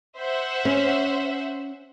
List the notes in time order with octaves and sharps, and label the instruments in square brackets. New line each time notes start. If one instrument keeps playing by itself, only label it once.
[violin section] C5 E5 F#5
[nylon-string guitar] C#4